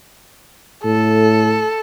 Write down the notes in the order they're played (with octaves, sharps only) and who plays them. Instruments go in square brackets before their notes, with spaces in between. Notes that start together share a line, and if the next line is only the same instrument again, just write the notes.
[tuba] A2 [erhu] A4